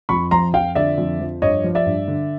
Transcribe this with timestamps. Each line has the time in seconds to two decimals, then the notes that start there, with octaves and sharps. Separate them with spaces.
0.09 F2 B5 C#6
0.31 F3 A#5 C6
0.54 F2 F5 G5
0.75 D3 D5 E5
0.98 F2
1.20 F3
1.42 G2 C#5 D#5
1.64 F3
1.75 D5 E5
1.86 G2
2.08 D3